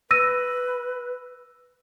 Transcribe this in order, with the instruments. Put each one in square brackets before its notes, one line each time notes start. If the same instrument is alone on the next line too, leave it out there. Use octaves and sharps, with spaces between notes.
[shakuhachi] B4 [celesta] E6 A#6 D#7